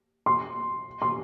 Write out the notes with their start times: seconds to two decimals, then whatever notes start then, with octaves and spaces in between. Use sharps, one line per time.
0.26 C6
1.02 C6